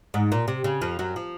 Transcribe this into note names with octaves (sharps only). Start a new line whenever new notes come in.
G#2
A#2
C3
C#3
F2 F3
F#2 F#3
F3